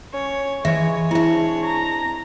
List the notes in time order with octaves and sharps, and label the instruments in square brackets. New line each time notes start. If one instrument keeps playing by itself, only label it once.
[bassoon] C#4 [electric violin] C#5
[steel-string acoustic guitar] E3 [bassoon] G#3 [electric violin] C#5 [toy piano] E5
[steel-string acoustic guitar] C4 D4 [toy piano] E4 E5
[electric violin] A#5